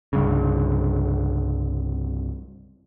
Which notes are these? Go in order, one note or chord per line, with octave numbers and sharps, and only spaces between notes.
C2 G2 C#3